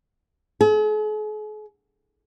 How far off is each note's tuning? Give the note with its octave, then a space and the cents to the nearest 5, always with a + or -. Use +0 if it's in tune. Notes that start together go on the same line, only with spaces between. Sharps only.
G#4 +45